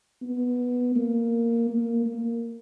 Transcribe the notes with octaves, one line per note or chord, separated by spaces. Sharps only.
B3
A#3
A#3
A#3